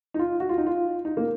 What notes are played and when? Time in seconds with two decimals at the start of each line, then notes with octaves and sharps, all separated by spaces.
0.14 D#4
0.19 F4
0.40 F#4
0.49 F4
0.58 D#4
0.66 F4
1.05 D#4
1.17 A#3